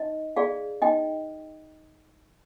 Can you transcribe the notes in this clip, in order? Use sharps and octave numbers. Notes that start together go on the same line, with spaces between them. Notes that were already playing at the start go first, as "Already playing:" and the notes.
Already playing: D#4 D#5
G#4 D5 F5
D#4 D#5 G5